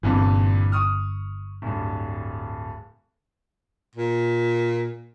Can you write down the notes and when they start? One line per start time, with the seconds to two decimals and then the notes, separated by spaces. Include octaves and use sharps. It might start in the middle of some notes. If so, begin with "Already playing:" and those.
0.03 G1 G2 A#2 E3 C4
0.72 C#6 D#6 F6
1.62 D1 G2
3.96 A#2